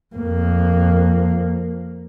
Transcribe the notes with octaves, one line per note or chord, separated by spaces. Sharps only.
F2 A#3